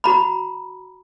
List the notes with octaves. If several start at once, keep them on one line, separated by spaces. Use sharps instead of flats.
F#4 A#5 B5